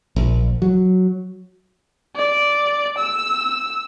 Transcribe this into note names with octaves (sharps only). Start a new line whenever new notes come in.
A#1
F#3
D5
E6